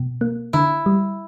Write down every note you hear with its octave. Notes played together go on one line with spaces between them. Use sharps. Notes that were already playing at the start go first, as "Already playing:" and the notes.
Already playing: B2
A#3
D3 E4
G3